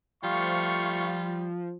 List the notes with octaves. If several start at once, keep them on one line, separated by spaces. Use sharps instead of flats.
F3 G3 A3 F4 F5 C#6